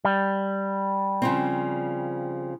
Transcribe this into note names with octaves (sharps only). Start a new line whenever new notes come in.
G3
C#3 F3 C4